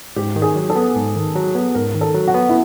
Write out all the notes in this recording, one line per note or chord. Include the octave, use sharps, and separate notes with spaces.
G#2 G4
D#3
G#4
F#3
A4
B3
G#2
D#3
F#3
B3
G#2 A#4
D#3
A4
F#3
F#4
B3
E4